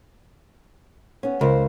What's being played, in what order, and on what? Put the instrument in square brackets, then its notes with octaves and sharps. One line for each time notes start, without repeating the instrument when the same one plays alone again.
[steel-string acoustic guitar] B3 C#4
[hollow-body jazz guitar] C#2 [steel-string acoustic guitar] A#4 C5